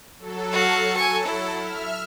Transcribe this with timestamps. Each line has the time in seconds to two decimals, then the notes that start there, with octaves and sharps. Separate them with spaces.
0.19 F#3 A4
0.53 F#4 F5
0.96 G#5 C#6
1.25 E4
1.57 E5 F6